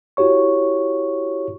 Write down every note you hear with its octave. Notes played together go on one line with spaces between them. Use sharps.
E4 F#4 G4 C#5 C#6